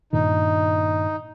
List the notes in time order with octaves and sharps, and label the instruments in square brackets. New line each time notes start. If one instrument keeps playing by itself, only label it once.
[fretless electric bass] G2 A#2 D#3 [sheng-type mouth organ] D#4